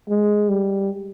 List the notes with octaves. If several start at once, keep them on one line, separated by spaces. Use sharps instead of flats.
G#3
G3